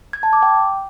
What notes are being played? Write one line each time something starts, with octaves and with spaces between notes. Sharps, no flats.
G#6
A5
D6
G5